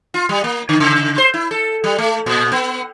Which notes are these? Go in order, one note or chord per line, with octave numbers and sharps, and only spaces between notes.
F4
G3
A#3
D3
C#3
C5
E4
A4
G3
A3
A#2
B3